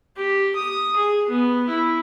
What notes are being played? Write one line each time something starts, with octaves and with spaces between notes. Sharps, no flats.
G4
D#6
G#4
B3
E4